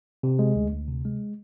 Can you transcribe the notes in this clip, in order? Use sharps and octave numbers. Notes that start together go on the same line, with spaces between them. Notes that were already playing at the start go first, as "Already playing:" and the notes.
C3
G#3
D2
D2
C3
G#3